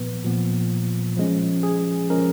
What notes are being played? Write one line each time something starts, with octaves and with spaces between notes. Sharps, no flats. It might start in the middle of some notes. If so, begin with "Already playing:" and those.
Already playing: A#2 F3 B3 B4
A#2 F3 B3
F3 G#3 C#4
G#4
F3 G#3 C#4 A#4